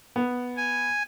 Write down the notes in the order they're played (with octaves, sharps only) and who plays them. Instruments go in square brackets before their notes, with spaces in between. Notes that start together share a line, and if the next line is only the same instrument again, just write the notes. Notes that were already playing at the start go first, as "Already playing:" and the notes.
[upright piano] B3
[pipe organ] G#5